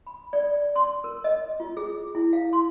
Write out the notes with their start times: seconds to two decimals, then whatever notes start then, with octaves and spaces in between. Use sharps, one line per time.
0.07 B5
0.33 D5
0.53 D5
0.76 C6
1.04 A#4
1.24 D#5
1.60 F4
1.77 G#4
2.15 E4
2.33 F5
2.53 C6